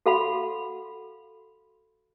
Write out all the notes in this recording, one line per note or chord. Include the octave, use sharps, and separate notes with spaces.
F#4 A4 F5 F#5 B5 C6